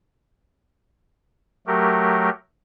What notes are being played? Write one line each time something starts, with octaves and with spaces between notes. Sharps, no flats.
F#3 A3 G4 A#4